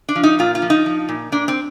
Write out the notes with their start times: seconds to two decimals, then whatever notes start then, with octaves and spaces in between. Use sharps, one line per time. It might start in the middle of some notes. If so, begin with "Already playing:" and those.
0.09 D4
0.15 F3
0.23 D#4
0.39 A#2 F4
0.55 F4
0.62 F3
0.70 D#4
0.86 F3
1.08 A#2
1.32 A#2 D4
1.48 C4